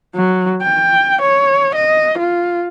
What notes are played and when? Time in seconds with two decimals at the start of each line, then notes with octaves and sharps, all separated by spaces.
0.15 F#3
0.63 G5
1.22 C#5
1.75 D#5
2.19 F4